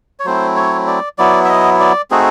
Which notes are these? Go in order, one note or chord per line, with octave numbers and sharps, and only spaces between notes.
C#5
F#3 A3 C4 E4 C5
C#5
D5
F#3 B3 E4 D5
E5
D#5
D5
A3 C4 D#4 F#4 G#4